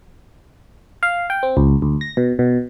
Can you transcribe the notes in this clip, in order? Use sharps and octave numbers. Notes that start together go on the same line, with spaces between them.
F5
G5
C4
C#2
D2
A#6
B2
B2